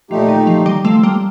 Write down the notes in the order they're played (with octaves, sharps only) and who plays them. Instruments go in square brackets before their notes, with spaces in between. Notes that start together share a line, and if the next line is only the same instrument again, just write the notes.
[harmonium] A#2 A3 D#4 G4 [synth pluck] F3
[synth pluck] D#3
F3
D#3 G3
F3 A3
G3 A#3